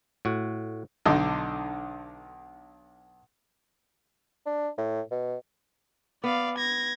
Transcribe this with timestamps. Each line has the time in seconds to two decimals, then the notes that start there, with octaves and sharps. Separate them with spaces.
0.25 A2 F#4
1.05 B1 D3 D#4 D#5
4.46 D4
4.78 A2
5.11 B2
6.24 B3 D5 F5
6.58 G#6 A#6